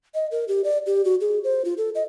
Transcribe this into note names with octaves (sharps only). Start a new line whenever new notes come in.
D#5
A#4
G4
D5
G4
F#4
G#4
C5
F4
A4
D#5